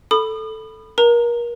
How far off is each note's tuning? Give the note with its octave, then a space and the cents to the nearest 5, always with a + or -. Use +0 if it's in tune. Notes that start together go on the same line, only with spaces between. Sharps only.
A4 +0 B5 +0 D#6 -35
A#4 +30 A#5 -15